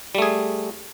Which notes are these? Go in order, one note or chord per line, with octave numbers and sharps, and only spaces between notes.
G3 A3 G#4